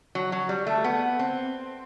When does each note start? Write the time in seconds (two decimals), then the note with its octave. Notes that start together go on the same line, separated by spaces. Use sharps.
0.15 F#3
0.32 F#3
0.49 G3
0.67 A3
0.84 B3
1.19 C4